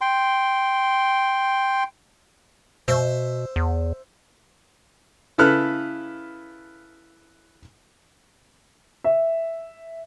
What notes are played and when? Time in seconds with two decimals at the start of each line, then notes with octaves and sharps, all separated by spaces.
0.01 G5 C6
2.88 B2 C5 E5
3.56 E2
5.38 C#3 E4 A4 B4 F6 F#6
9.04 E5